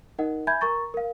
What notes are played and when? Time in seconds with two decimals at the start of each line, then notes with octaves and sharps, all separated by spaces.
0.19 D#4 A#4 D#5 F#5
0.47 E5 G#5 B5 G6 G#6
0.61 A#4 A#5 C#6 A6
0.94 A#4 F5